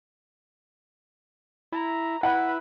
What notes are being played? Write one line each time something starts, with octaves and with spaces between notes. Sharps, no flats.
E4 A#5
E4 B4 F#5